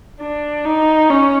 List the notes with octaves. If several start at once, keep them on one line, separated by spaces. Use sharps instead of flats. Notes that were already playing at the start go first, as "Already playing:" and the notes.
D4
D#4
C#4